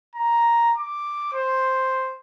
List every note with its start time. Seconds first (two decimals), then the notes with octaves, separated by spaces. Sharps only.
0.16 A#5
0.78 D6
1.33 C5